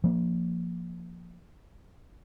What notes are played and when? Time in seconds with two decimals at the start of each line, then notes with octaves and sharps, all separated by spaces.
0.04 F3 A#3